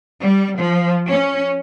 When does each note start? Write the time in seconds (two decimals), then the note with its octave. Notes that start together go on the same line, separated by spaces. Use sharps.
0.19 G3
0.57 F3
1.07 C#4